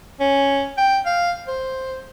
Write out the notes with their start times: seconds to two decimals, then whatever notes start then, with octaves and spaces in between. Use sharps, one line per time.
0.20 C#4
0.78 G5
1.06 F5
1.48 C5